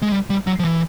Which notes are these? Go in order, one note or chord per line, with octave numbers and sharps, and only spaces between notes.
G#3
G3
G3
F#3
F3
E3